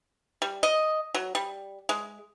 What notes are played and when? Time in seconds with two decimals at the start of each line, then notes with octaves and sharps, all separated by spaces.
0.42 G3
0.63 D#5
1.14 F#3
1.35 G3
1.89 G#3